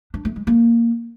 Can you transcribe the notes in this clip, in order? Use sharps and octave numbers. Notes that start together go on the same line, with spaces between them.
D4
A3
G#3
A#3